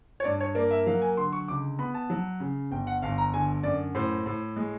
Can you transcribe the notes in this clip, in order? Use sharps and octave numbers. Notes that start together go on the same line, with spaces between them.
C#5
G2 D5
C#5
A#3 D5
E5
F#3 F5
G#5
D3 C6
C#6
C#2 D6
B3 B5
A5
F#3
C#3
G1 G5
F#5
G1 F5
A#5
D3 G#5
F#2 D5
A2 C5
A2
G#3